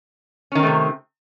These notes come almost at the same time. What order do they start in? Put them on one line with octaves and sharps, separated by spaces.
C#4 D#3 C4 A3 C3